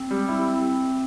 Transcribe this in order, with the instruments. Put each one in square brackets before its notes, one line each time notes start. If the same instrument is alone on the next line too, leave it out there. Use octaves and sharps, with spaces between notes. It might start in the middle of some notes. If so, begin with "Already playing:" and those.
Already playing: [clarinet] C4
[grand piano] G3
E4